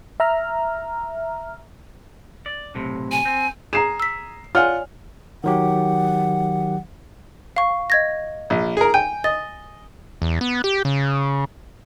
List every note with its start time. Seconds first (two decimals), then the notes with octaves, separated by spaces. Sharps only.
0.20 E5 A#5 F6
2.46 D5
2.75 B1 A2 C3
3.12 G#5
3.25 C4
3.73 G#4 A#5 C7 E7
4.00 E6 B6
4.55 F4 C#5 D5 F#5 G#5 F6
5.44 D#3 F#3 G4 F#5
7.56 F5 C#6
7.90 D#5 G#6 A#6
8.50 A#1
8.77 G#4 A#4
8.94 G5 G#5
9.24 D#5 A6
10.22 E2
10.41 B3
10.64 G4
10.85 C#3